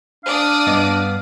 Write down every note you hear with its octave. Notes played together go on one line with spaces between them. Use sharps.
D4 D5 F5 D#6
G2 B3 D#5